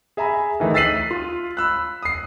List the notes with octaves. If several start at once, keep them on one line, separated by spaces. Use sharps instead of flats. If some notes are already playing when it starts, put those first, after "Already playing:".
G#4 E5 G#5 A#5 B5
D#3 E3 A3 D#4
E6 A6 B6 C7 D#7 F#7
F4
B5 E6 F#6
D#6 C7